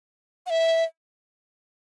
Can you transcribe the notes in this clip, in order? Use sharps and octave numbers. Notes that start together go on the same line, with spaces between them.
F#5
E5